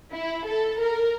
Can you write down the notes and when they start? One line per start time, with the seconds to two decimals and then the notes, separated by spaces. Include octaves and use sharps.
0.14 E4
0.46 A4
0.79 A#4